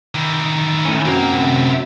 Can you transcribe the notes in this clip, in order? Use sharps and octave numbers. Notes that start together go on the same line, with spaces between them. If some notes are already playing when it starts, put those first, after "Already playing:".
D#3 E3
A2 C#4
C2 F#2 F#3 A#3 C4
A2 C3